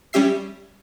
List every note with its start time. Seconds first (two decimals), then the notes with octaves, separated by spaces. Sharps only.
0.13 G3 C#4 G4 E5 C7